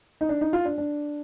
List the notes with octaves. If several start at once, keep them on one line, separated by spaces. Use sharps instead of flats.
D#4
D4
D#4
F4
D4
D4